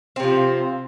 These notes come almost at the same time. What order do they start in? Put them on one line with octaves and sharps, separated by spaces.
C4 C3 F3